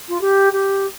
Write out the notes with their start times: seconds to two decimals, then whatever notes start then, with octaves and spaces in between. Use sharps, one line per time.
0.08 F4
0.21 G4
0.52 G4